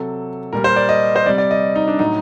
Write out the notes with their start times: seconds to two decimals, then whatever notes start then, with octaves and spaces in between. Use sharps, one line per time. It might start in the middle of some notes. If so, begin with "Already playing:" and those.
Already playing: C3 F#3 A4
0.53 A#2 G3 A#4
0.64 C5
0.76 D5
0.89 D#5
1.16 C5
1.26 C3 G3 D5
1.38 D5
1.51 D#5
1.76 D#4
1.88 D4
1.99 A2 F#3 D#4